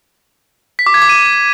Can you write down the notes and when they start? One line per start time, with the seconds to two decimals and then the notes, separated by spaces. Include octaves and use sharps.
0.79 B6
0.87 D6
0.94 G#6
1.02 D6
1.09 D#7